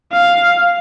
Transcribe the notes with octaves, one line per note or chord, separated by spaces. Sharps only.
F5